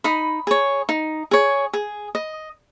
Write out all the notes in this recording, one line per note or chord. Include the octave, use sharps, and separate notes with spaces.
D#4 B5 D#6
G#4 C#5
D#4
G#4 C#5
G#4
D#5